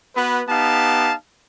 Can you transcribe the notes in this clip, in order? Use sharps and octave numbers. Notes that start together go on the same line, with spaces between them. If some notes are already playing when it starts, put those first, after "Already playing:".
B3 F#4 B4
B3 D#4 G4 F5 A5